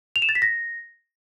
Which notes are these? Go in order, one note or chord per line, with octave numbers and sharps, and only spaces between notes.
F7
E7
A6
B6
A#6